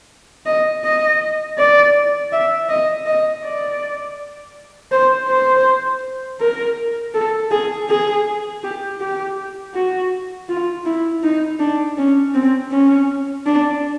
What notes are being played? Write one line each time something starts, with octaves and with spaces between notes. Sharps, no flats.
D#5
D#5
D5
E5
D#5
D#5
D5
C5
C5
A#4
A4
G#4
G#4
G4
G4
F#4
F4
E4
D#4
D4
C#4
C4
C#4
D4